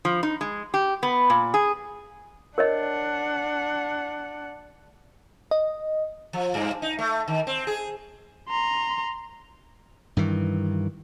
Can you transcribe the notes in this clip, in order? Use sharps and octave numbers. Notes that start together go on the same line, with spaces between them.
F3
D#4
G#3
G4
B3
A#2
G#4
D4 A#4 C#5 D#5 F#5
D#5
F3
G2
D#4
A3
D#3
C4
G#4
A#5 C6
G2 D#3 E3